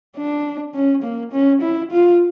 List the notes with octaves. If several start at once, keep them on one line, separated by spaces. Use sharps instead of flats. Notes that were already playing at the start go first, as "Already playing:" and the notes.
D4
C#4
A#3
C#4
E4
F4